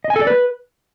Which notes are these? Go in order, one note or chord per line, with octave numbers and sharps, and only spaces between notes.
D#5
G#5
A4
D5
B4